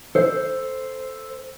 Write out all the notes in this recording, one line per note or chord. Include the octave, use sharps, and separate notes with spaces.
A4 C5